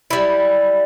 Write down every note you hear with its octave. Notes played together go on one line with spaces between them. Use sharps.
G3 E4